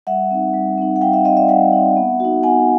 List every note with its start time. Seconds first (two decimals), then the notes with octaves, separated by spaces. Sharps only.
0.07 G3 E5 F#5
0.31 C4 D#4
0.54 G3
0.78 C4 D#4
0.96 F#5
1.01 G3 F5 G5
1.13 E5 F#5
1.25 C4 D#4 D#5 F5
1.37 D5 E5
1.48 G3 E5 F#5
1.73 C4 D#4
1.97 B3
2.20 D#4 F#4
2.43 B3 F#5 G#5